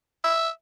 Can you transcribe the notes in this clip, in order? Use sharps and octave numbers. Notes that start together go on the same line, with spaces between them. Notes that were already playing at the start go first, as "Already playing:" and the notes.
E5